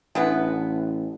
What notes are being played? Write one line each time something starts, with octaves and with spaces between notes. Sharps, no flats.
A1 D3 E3 B3